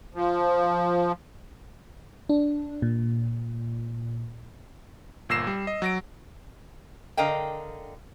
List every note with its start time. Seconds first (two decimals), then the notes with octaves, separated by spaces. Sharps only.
0.14 F3
2.29 D4
2.82 A#2
5.29 G1 A#2 E6 A#6 C7 E7
5.47 G3
5.67 D#5
5.82 F#3 A#6 D7
7.17 D3 A#4 D#5 F5 G5